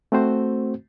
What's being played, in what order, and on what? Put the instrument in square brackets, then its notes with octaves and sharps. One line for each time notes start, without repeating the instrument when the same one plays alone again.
[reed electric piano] A3 C4 F#4 C5